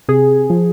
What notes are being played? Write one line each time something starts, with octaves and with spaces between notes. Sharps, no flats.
C3 G#4
F3